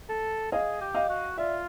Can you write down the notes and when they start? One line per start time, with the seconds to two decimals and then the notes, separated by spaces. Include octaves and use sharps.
0.09 A4
0.52 G#4 D#5 F5
0.81 G4
0.94 D#5 F5
1.09 F#4
1.38 F4 D5 E5